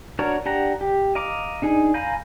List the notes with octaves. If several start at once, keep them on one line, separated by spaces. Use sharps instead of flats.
D4 F#4 A#4 C#5
D4 G4 F#5 A#5
G4
D#5 F5 A#5 D6
D4 D#4 G#4
F5 G#5 A#5 B5 G6